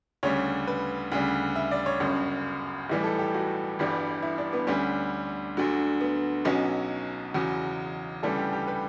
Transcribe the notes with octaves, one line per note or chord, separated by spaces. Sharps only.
D2 C#3 G3 C#5
B4
D2 C#3 G3
E5
D5
C#5
G1 F#2 C#3
B1 A2 E3 G3
A4
G4
F#4
G1 G2 E3 G3
E4
D4
B3
D2 D3 G3 C#4
D2 D3 F#3
B3
B1 B2 F#3 C#4
E2 C#3 F#3 C#4
D2 C#3 E3 G3 A4
G4
G4
B4